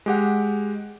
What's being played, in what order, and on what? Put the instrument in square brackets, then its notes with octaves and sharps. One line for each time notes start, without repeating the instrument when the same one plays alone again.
[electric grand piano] G#3 G4 F#5